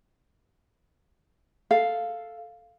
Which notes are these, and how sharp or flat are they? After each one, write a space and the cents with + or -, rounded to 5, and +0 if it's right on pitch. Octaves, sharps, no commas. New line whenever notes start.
A4 +0 F5 +0